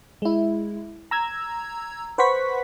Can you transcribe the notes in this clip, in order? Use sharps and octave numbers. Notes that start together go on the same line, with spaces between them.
G#3 E4
A#5 E6 G#6
B4 C5 F#5 B5 C#6 B6